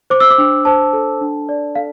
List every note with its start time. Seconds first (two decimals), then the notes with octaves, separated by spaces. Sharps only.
0.10 C5 D6
0.20 E6
0.30 D6
0.38 D4
0.65 C5 A5
0.93 A4
1.21 D4
1.49 D5
1.75 A4 F5